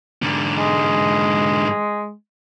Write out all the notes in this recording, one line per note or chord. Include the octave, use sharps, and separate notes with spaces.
G#2 D3
G#3